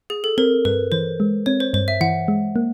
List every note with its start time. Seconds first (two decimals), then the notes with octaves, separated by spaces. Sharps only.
0.10 G#4
0.24 A4
0.38 C4 A#4
0.65 G2 B4
0.92 E3 C5
1.20 G#3
1.46 C4 C#5
1.60 C5
1.74 G2 C5
1.88 E5
2.01 E3 F#5
2.28 G#3
2.56 A#3